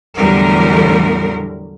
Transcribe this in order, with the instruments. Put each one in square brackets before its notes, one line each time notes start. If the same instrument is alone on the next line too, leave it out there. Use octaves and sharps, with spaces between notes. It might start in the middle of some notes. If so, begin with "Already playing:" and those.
[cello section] E2 A2 D3 F#3 G3 A#4